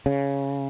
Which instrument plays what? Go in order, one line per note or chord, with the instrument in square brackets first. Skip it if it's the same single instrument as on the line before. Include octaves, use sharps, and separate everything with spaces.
[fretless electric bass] C#3